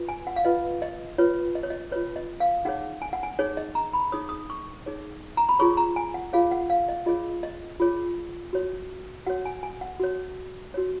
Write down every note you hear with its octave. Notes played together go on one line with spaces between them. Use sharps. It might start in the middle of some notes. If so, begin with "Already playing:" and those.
Already playing: F4 B4
G#5
F#5
F5
F4 B4 D#5
D#5
F4 B4 C#5
D#5
C#5
D#5
F4 B4 C#5
D#5
F5
D#4 G#4 C#5 F#5
G#5
F#5
G#5
D#4 G#4 C#5
D#5
A#5
B5
D#4 G#4 C#5 D#6
D#6
C#6
D#4 G#4 C#5
A#5
B5
F4 G#4 C#5 C#6
A#5
G#5
F#5
F4 G#4 C#5 F5
F#5
F5
D#5
F4 G#4 C#5 D#5
D#5
F4 G#4 C#5
F#4 C#5
F#4 C#5 F#5
G#5
G#5
F#5
F#4 C#5
F#4 C#5